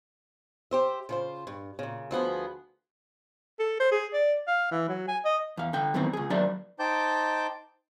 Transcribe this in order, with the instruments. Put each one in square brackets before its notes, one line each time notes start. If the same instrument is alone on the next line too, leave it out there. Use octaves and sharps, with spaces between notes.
[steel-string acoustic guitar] G4 C5 E5
C#3 F4 C5
G2
A#2 C#3
D2 F3 B3 G#4
[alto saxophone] A4
C5
G#4
D5
F5
E3
F#3
G#5
D#5
[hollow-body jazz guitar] E2 F5
D3 G5
F#2 B2 D#3 E3 C4
C#2 G#4
D#2 F#3 D4 C5 D5 E5
[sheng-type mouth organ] D#4 C5 G5 A5 D6 G6